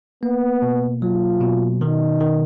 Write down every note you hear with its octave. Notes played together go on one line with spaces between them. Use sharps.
A#3 B3
B2
F#3 F4
B2
D#3 D#4
D#3